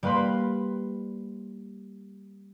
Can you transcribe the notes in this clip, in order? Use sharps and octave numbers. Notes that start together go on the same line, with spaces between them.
G3 A#3 B4 B5 C6